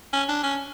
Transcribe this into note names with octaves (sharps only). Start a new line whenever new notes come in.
C#4
D4
C#4